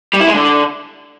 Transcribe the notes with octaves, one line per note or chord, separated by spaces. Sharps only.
G3
E4
G#3
D3